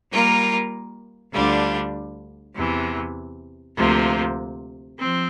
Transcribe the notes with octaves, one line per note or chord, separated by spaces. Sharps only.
G3 A#3 F4 A#4
D2 D3 G3 D4 F4
E2 C3 E3
D2 C3 F3 A#3
F3 C4